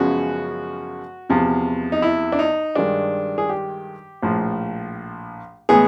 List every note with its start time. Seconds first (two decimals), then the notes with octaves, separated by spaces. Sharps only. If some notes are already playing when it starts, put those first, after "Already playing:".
Already playing: F#2 C#3 F3 G#3 B3 F#4
1.30 E2 C3 F3
1.92 D#4
2.02 E4
2.32 D4
2.39 D#4
2.75 G2 D#3 G#3 D4
3.38 G#4
3.49 G4
4.22 A#1 A2 F3
5.69 A2 E3 G#3 B3 G#4